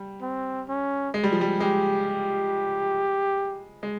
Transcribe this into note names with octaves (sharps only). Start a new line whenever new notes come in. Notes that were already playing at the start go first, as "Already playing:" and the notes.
Already playing: G3
C4
C#4
G#3
G3
F3
G3
G#3 G4
G#3